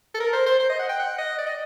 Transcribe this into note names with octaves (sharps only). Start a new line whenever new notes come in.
A4
A#4
C5
C5
C5
D#5
F#5
G5
F#5
D#5
D5
D#5